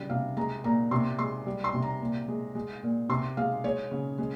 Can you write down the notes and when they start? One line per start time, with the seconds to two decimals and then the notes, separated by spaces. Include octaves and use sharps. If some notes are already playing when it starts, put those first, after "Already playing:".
Already playing: C#3 G3
0.09 C3 F5
0.37 G#3 A#5
0.64 A#2 A#5
0.91 C3 C6
1.19 G#3 C6
1.46 G3
1.64 C6
1.73 C3
1.82 A#5
2.01 A#2
2.28 G#3
2.55 G#3
2.83 A#2
3.09 C3 C6
3.37 G#3 F5
3.64 G#3 C#5
3.91 C#3
4.18 G#3